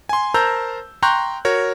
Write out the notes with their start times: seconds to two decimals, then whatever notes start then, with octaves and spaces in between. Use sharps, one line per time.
0.09 G#5 C6
0.34 A#4 C5 A5 A#5 E6 G6
1.02 G5 A#5 C6 C#6 F#6 G6
1.45 F#4 A#4 C#5